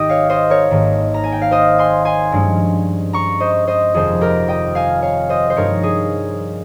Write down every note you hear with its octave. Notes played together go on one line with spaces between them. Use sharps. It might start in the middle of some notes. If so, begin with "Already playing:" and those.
Already playing: G#1 G#2 D#3 G4 A#4 D#5 G5
C#5 F5
C5 D#5
A#4 C#5
G#1 G#2 D#3 A#3
A#5
G#5
G5
F5
C5 D#5
G#5 C6
G#5 C6
G2 F3 G#3 C#4
A#5 C#6
C5 D#5
C5 D#5
F1 F2 D#3 G#4 C5
G4 A#4
D#5 G5
F5 G#5
C#5 F5
C5 D#5
C5
G2 F3 G#3 D#4 A#4 C#5
G#4